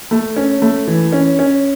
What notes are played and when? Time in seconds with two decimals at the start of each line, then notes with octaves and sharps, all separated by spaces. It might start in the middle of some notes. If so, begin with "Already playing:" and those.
0.11 A3
0.36 C#4
0.62 A3
0.88 E3
1.12 C#4
1.39 C#4